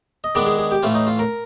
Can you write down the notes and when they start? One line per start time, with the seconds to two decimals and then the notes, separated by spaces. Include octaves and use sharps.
0.24 D#5
0.35 D#3 G#3 B3 D4 D5
0.46 G#4
0.59 G#4
0.71 G4
0.83 A2 E3 A3 C#4 F4
0.95 D#4
1.07 F4
1.19 A#4